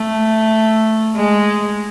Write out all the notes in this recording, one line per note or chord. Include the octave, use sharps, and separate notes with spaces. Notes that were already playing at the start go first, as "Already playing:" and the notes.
Already playing: A3
G#3